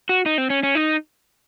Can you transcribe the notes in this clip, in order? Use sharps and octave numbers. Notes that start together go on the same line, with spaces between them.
F#4
D#4
C4
C#4
C#4
D#4